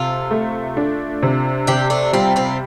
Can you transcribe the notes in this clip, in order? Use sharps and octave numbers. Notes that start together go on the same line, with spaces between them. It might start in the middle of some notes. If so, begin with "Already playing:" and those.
Already playing: C3 F4 A4
A3
D4
C3
C3 D4 G4
A3 D4
G3 C4 F4
C4 F4